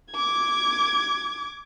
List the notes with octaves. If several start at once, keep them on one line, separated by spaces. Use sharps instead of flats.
D6 G#6